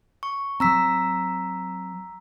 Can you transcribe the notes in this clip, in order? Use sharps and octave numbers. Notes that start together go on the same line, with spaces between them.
C#6
F#3 C4 A#5 E6 B6